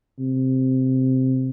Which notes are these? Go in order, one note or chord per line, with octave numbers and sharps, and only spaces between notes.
C3